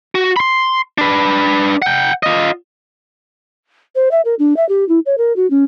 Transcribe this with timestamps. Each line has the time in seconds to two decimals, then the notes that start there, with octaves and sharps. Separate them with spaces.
0.15 F#4
0.36 B5 C6
0.98 D4 B4
1.82 F#5 G5
2.23 F4 D#5
3.95 C5
4.11 E5
4.25 A#4
4.39 D4
4.56 E5
4.69 G4
4.89 E4
5.06 C#5
5.18 A#4
5.36 F#4
5.50 C#4